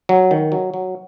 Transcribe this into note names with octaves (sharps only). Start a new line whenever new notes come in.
F#3
D#3
F#3
F#3